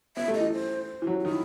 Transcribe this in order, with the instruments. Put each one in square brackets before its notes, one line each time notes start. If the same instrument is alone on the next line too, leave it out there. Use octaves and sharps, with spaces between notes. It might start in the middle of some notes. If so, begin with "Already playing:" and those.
[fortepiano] B3 [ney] E5
[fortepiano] A3
[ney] D#5
[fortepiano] E3
[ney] C5
[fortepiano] E3
F#3
[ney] D#4
[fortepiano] D#3 [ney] E4